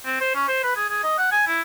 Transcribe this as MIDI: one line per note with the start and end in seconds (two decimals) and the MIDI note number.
0.06 0.20 60
0.21 0.32 72
0.35 0.44 61
0.48 0.63 72
0.64 0.73 71
0.76 0.87 68
0.89 1.02 68
1.04 1.18 75
1.18 1.30 78
1.32 1.43 80
1.47 1.61 64